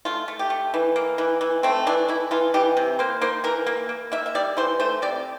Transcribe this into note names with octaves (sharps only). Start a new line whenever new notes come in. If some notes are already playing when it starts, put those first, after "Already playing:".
A3 F4
A3
G4
A3
E3
A#3
E3
E3
A3 C4
E3 D4
E3 E4
E3 F4
E3 G4
C3
A#3 C5
A#3 C5
E3 A#4
A#3
A#3
A#3 E5
E5
G3 D5
E3 C5
A3 C5
C3 D5